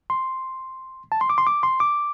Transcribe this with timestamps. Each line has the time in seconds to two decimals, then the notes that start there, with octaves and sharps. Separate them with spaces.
0.10 C6
1.12 A5
1.21 C6
1.30 D6
1.38 C6
1.47 D6
1.63 C6
1.80 D6